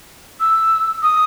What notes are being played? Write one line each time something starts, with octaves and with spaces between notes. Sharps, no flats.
E6
D#6